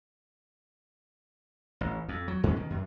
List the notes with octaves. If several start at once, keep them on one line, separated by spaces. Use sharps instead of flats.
A1
F2
F#3
G2 G#3 A3 C#4
B2 D#3
F#2